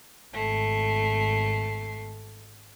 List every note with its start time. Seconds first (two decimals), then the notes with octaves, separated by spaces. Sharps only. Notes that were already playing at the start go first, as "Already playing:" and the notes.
0.34 G#1 A3 C7